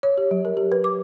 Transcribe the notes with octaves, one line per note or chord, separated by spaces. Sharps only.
C#5
G4
F#3
A#4
G4
B4
D6